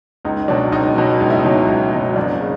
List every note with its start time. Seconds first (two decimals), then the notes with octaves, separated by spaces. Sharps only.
0.25 C#2 D#4
0.48 B2 F#3 D4
0.72 C#2 D#4
0.96 B2 F#3
1.21 C#2 D#4
1.30 E4
1.39 D#4
1.45 B2 F#3
1.68 C#2
1.92 B2 F#3
2.16 F#1 D4
2.41 C#3